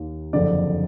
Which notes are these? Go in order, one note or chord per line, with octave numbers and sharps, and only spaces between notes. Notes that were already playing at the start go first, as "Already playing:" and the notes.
Already playing: D#2 D#3
F#1 F2 D3 D5